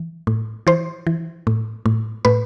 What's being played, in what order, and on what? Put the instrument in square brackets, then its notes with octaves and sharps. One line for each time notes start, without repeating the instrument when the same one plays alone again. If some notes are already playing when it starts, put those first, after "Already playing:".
Already playing: [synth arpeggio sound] E3
A2
E3 C5
E3
A2
A2
A2 B4